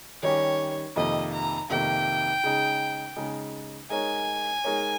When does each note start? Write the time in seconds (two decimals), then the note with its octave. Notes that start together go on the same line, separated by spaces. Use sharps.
0.22 D#3 G3 C#4 G4 C#5
0.96 F2 C3 D#3 A#3 D#5
1.32 A#5
1.69 F2 C3 D#3 A#3 G5
2.44 C#3 G#3 D#4 G#4
3.16 C#3 G#3 D#4 G#4
3.90 G#3 D#4 A#4 C#5 G#5
4.64 G#3 D#4 A#4 C#5